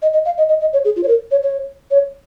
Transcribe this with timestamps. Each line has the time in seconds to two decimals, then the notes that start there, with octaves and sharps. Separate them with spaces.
0.02 D#5
0.13 D#5
0.25 F5
0.38 D#5
0.49 D#5
0.61 D#5
0.73 C#5
0.85 G#4
0.96 F4
1.03 C#5
1.08 A#4
1.31 C#5
1.43 C#5
1.91 C#5